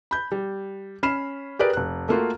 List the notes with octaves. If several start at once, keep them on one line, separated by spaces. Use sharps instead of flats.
B5 G6
G3
C#4 B5 F6 C7 E7
G4 G#4 A#4 B4 D5
F1 F#6
A3 A#3 F4 F#4